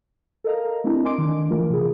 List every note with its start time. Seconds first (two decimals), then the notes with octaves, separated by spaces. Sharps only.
0.44 A4 A#4 D#5 F5 A#5
0.84 A3 C4 D4 E4 G4
1.04 A#4 D#5 G#5 C6 D6 D7
1.18 D#3 D4
1.49 E3 F3 A3 F4 A#4
1.70 C3 G#4